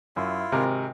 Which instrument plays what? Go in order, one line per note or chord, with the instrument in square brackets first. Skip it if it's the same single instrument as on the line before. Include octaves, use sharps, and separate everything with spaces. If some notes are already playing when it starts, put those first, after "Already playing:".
[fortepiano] F#2 [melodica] E4 F4
[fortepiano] G#1 C3 A#4